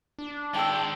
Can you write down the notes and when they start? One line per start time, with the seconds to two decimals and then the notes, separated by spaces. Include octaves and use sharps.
0.19 D4
0.54 D#3 G#3 G5 A5 E6